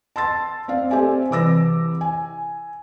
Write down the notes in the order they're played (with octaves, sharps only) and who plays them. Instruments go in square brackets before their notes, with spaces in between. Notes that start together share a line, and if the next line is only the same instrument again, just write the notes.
[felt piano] A5 C6 E6 A6
C4 D5 F5
C4 G4 A4 D5 E5 G#5
C2 E3 D6 E6 A#6
G#5